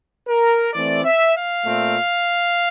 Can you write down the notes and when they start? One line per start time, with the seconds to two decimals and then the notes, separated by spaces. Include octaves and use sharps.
0.28 A#4
0.73 E3 A3 C4 D5
1.05 E5
1.35 F5
1.66 A#2 A3 C4